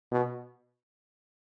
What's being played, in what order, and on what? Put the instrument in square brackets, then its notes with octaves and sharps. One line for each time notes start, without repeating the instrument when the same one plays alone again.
[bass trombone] B2